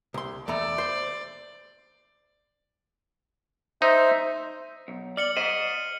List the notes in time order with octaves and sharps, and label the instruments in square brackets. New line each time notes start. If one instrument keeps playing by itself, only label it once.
[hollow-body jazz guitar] C2 C6
[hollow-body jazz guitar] E2 A3 A#5 [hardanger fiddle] D5
[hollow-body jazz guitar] C5 C6
[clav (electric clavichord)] D#4 [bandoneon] C5 E5
[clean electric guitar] B1
[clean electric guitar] D5 [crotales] F6 C#7 F#7
[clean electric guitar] C5 D#5 [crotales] D#7